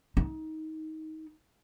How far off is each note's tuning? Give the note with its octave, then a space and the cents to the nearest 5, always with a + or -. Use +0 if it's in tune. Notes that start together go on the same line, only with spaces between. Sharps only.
D#4 +20